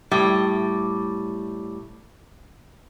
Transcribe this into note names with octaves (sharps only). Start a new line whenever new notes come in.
A2 G3